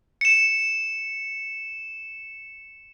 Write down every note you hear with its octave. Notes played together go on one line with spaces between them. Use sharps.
C#7 E7